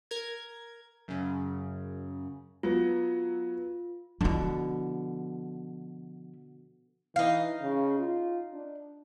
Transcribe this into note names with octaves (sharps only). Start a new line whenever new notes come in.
A#4 G#6
F#2 C#3
F#3 B3 F4
B2 D3 F3 E4
E3 D#4 F5
C#3
F4
D4